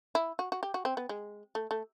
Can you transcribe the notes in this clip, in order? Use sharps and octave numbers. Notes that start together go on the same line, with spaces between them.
E4
F#4
F#4
G4
F#4
C4
B3
G#3
A3
A3